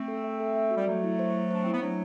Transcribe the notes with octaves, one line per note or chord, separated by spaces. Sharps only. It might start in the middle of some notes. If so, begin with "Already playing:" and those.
Already playing: A3 C4
A4
E5
A4
E5
F#4
G3
F#3 A3 A4
E4
C5
C5
D4 C5
C4 E4
B3
F#3 A3 D4